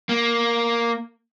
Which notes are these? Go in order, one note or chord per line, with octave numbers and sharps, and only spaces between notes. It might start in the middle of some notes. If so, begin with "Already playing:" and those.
A#3